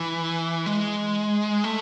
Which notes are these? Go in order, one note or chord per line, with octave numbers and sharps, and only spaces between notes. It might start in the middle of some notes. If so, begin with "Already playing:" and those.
Already playing: E3
G#3
A3